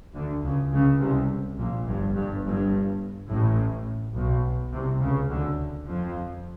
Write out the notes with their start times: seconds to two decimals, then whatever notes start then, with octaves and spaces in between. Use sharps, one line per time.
0.14 D2 D3
0.43 C#2 C#3
0.72 C#2 C#3
1.00 C2 C3
1.58 A#1 A#2
1.86 G1 G2
2.15 G1 G2
2.43 G1 G2
3.29 A1 A2
4.15 B1 B2
4.72 C2 C3
5.01 C#2 C#3
5.29 D2 D3
5.86 F2 F3